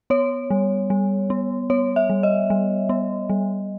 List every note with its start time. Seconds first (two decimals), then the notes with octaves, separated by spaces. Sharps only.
0.10 B3 C#5
0.50 G3
0.90 G3
1.30 B3
1.70 B3 C#5
1.96 E5
2.10 G3
2.23 D#5
2.50 G3
2.89 B3
3.29 G3